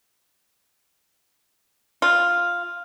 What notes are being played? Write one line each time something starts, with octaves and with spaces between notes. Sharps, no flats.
F4